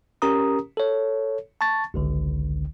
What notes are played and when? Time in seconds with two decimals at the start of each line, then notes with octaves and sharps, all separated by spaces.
0.22 C#4 G4 A#4 A#5 D#6
0.77 A4 C#5
1.61 A5 C#6 A6
1.94 G#1 C#2 D3